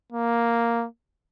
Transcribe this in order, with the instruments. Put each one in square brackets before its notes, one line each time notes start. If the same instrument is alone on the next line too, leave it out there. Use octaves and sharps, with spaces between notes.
[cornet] A#3